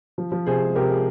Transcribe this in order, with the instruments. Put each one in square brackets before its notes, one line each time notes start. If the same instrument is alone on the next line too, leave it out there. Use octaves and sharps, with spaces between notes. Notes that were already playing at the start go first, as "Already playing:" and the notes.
[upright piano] F3
F3
C3 G#4 C5
G#3
C3 G4 A#4
G#3